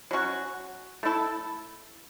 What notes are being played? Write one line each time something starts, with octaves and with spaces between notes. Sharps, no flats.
F#3 C#4 F#4
A3 E4 A4